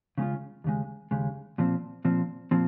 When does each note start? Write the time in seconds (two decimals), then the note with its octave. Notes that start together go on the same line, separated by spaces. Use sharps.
0.18 C#3 G#3 C#4 F4
0.64 D#2 C#3 G#3
1.11 D#2 C#3 G#3
1.58 A#2 F3 C4
2.05 A#2 F3 C4
2.51 A#2 F3 C4